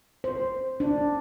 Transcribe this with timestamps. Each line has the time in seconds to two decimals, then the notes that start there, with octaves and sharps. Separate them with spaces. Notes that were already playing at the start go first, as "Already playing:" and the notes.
0.24 C5
0.80 D4